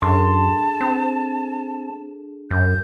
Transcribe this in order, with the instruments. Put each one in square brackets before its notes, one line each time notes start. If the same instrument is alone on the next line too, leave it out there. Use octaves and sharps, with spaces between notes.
[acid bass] F#2 [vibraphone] D4 G#4 A4 [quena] A5 [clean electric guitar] C6
[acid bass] C4
[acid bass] F#2 [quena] G6